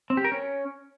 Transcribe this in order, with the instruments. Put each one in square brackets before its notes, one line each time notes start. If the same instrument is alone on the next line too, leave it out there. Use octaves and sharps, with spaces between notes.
[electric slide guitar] C4
G4
A#4
C#4